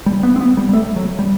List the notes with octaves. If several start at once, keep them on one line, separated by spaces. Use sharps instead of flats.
G3
B3
C4
B3
G3
G3
A3
F#3
G3